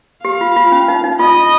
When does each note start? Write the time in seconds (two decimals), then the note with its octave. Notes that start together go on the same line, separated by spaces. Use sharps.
0.24 G4 F5
0.41 F4
0.56 F4
0.72 C#4
0.88 D#4
1.04 D#4
1.19 F4 D#5